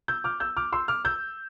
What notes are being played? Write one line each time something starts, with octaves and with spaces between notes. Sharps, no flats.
E6 G6
D6 F6
E6 G6
D6 F6
C6 E6
D6 F6
E6 G6